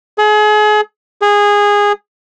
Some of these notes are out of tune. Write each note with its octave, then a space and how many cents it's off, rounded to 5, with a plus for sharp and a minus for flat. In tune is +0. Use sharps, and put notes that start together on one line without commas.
G#4 +35
G#4 -15